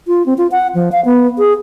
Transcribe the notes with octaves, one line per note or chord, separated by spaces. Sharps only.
F4
C4
F4
F#5
F3
F5
B3
G#4